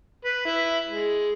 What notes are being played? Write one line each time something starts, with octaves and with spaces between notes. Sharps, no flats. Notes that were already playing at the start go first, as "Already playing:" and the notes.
B4
E4
G#3